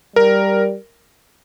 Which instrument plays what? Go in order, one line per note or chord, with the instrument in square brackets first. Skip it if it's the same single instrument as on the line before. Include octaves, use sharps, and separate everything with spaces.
[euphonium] G3 [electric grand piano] A#4